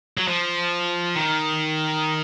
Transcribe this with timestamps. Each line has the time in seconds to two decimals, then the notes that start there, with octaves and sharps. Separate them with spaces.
0.17 F#3
0.28 F3
1.16 D#3